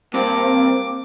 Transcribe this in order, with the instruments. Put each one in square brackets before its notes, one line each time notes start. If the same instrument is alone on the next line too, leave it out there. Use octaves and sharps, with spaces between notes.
[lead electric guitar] G2 [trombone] A#3 [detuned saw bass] C4 [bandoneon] D6